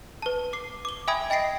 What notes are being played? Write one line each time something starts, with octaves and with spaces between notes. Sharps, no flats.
B4 A5
D6 C7
D6 G7
E5 G5 G#5 B5 D#6 G#6
D#5 G5 A6 A#6 C7 D7